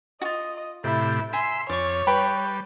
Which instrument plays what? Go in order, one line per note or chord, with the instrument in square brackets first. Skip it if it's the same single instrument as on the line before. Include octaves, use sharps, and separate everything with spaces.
[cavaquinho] F4 F#4 [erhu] D#5
[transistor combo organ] A2 C3 G4 [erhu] E4
[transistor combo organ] E5 [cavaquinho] G#5 A#5 [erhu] C6
[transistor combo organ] F2 [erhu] C#5 [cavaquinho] D5 C#6
[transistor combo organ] G3 [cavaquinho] B4 G5 B5